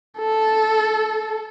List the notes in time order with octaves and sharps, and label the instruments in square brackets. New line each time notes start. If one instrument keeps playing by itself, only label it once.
[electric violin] A4